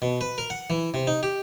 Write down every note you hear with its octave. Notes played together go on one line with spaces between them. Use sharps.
B2
B4
A#4
F#5
E3
C3
D#4
G4